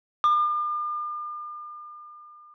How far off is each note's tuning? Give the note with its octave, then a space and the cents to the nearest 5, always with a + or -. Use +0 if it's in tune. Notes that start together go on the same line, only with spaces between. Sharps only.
D6 +45